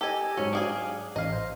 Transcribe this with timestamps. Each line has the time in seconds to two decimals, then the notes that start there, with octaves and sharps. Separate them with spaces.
0.01 G4 A4 D#5 G#5
0.37 G#2 F#3 C#4
0.53 D4 G#4 F5 G#5 D6
1.16 A1 D#5 F5
1.33 C5